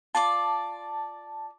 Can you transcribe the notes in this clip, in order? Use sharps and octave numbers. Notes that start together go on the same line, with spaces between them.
F4 D5 A5 D6